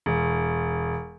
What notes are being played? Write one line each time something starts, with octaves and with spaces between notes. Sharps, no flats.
E1